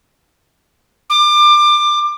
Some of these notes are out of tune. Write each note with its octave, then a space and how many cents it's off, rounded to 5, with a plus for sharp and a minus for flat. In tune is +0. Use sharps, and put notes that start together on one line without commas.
D6 +25